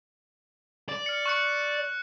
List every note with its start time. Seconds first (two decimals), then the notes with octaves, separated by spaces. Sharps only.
0.89 D5
1.06 F6 C#7
1.26 C#6 F#6 C#7